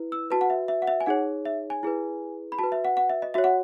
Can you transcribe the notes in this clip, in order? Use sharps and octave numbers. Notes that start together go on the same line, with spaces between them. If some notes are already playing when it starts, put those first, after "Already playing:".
Already playing: E4 B4
E6
F#4 B4 A5
F#5
E5
E5
F#5
E5
G#5
D#4 G#4 C#5 F#5
E5
G#5
E4 G#4 B4
B5
F#4 B4 A5
E5
F#5
F#5
E5
D#5
F#4 C#5 E5
F#5